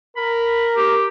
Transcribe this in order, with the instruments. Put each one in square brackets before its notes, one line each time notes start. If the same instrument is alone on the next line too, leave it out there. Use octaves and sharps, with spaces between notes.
[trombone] A#4 [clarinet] B5
[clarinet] G4